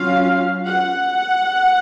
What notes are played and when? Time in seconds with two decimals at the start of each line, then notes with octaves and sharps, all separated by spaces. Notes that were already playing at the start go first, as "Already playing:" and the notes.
Already playing: F#3 C#4 F4 F5
0.67 F#5